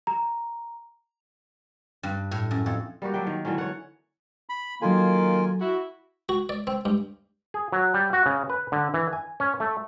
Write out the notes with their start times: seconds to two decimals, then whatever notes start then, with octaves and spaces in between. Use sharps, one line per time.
0.07 A#5
2.03 G2
2.31 A2
2.51 F#2
2.66 F2
3.02 G3 A#3 F#4 G4
3.14 F#3 D4 E5 G5
3.27 D#3
3.45 D3 E3 F#3 C#4
3.58 C#5 F#5
4.49 B5
4.82 D#3 F#3 A#3 F4 A4 G#5
5.61 E4 F#4
6.29 F#4
6.49 D5
6.67 C4
6.85 G2
7.54 G#4
7.72 F#3
7.94 G3
8.13 F#4
8.26 C#3
8.50 B4
8.72 D3
8.94 E3
9.13 G#5
9.40 C#4
9.60 A3